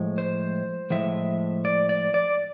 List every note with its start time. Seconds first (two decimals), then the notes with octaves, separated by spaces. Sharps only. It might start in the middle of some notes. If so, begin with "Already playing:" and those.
Already playing: A2 F3 G#3
0.18 C5
0.90 A2 F3 G#3 E5
1.65 D5
1.89 D5
2.14 D5